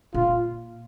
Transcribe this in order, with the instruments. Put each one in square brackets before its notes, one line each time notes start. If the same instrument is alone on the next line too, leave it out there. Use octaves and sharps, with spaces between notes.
[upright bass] A#2 [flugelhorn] F4